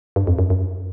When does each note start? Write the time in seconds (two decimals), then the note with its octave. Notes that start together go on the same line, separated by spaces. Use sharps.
0.16 G2
0.27 F2
0.39 F#2
0.50 F#2